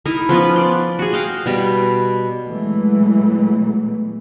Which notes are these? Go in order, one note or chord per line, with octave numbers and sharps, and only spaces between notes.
D#4 E4 A#4
F3 B3 C#4 B4
D5 C6
F#4 G#4
D#5 F5 G5
B2 G3
A#2 E3 F#3 G#3 A3 B3